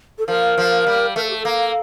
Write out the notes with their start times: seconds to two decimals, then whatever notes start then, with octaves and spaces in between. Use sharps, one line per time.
0.19 A4
0.27 F3 A#4
0.58 F3
0.86 G3
1.16 A3 A#4
1.23 A4
1.30 G4
1.37 A4
1.45 A#3